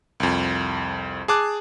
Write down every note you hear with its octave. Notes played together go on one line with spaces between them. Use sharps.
C2 F2
G#4 A5 D6 F#6